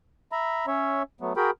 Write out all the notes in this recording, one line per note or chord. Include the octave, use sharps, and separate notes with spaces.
E5 A#5 B5
C#4 C#5 E5
F#3 A3 B3
F#4 G#4 A#4 G5 B5